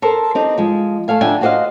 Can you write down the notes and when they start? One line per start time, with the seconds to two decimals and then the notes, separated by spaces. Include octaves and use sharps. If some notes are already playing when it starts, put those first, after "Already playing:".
0.02 A4 A#4 C5
0.35 C4 D#4 G4
0.58 F3 G#3
1.08 A3 A4 F5 G#5
1.21 F2 D3 D4 E5 G5 G#5
1.41 F#4 G4 C5 D5 D#5 F5